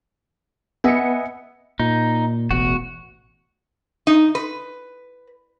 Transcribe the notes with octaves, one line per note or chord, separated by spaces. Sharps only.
B3 D#5 E5 G#5 C#7
A#2 D#4
E1 A1 E2 F#4
D#4
B4